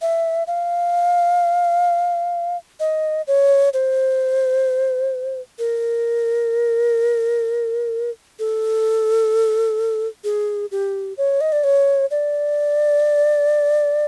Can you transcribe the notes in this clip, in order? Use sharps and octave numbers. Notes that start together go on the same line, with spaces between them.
E5
F5
D#5
C#5
C5
A#4
A4
G#4
G4
C#5
D#5
D5
C#5
D5